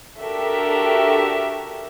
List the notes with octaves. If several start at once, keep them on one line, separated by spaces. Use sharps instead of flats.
D4 F#4 G4 A4 A#4 E5